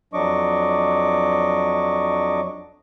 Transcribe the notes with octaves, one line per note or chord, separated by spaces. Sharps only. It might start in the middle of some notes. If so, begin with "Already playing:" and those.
F2 F#3 D4 D#5 C#6 D6